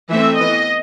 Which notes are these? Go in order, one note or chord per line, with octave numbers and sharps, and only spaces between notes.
E3 A3 C4 E5
E3 B3 D#5